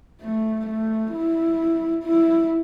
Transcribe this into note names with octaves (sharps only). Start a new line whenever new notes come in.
A3
A3
E4
E4